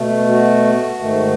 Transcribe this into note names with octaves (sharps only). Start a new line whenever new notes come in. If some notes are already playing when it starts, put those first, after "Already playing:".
Already playing: B2 A3
F#4
G#2 D#3 A3